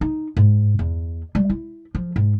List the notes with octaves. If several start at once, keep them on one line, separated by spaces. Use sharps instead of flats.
D#4
G#2
E2
G3
E4
F3
G#2